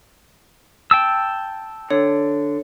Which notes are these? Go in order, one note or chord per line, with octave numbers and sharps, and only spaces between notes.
G5 A5 E6
D3 C#5